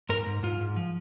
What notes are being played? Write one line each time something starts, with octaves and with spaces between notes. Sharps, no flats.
G#2 A#4
G#2
G#2 F4
G#2
F3